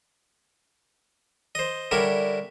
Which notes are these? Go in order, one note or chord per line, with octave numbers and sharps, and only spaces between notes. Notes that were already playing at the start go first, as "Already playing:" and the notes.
C5 D#5
D3 G3 E4 A#4 C#5